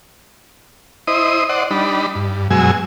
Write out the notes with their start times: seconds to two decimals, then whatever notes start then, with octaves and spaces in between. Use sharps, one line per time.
1.08 E4 C5 D#5 D#6
1.49 C5 D5 D#5 F#5
1.71 G3 D4 D#4 B5
2.15 G2
2.51 F#2 B2 F#3 G#3 G#5 E6